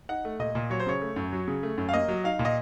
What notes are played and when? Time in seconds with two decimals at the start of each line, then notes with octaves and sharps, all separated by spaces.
0.09 D#4 F#5
0.25 A3
0.39 A#2 D#5
0.55 A#2
0.70 F#3 C#5
0.80 C5
0.87 C#3 C#5
1.02 A3
1.16 F#2
1.33 F#3
1.48 C#3
1.63 A3
1.78 F#2
1.89 F5
1.93 A#3 D#5
2.08 F#3
2.24 D#4 F5
2.39 A#2
2.45 D#5